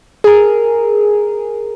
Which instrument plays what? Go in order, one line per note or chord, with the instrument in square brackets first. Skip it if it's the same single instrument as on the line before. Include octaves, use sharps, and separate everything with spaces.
[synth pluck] G#4 A#4